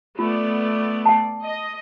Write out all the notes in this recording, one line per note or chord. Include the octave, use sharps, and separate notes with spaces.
A3 B3 F4 D5
F#5 A5
D#5